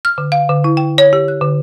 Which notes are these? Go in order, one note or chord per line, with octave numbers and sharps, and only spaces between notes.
F6
D3
F5
D3
E4
G5
C#5
G4
F#6
D3